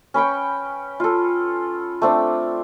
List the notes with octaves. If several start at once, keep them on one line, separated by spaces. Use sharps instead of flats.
C#4 B4 G5 C#6
F4 A4
A3 C4 D4